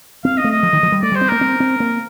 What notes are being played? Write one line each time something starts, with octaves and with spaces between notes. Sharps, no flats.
C4 F5
D#5
A3
D#5
F3
D#3
F3
G3
A3 D5
G3 C5
C4
A#3 A#4
C4
C4
A#3